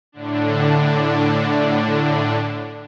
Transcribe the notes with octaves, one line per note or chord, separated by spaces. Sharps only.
A2 D3 D4